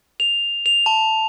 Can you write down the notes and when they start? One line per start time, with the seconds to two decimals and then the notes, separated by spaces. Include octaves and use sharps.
0.20 F7
0.66 F7
0.86 A5